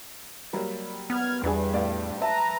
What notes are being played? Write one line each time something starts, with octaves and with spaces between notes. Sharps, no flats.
F#3 G3 A#3
B3 F6 G#6
E2 G2 G3 B3 D4 G#4
A2 D5 F5
B4 E5 A5 A#5